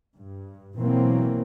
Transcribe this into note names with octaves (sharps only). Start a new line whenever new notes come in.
G2
B2 E3 F#3 A#3 C4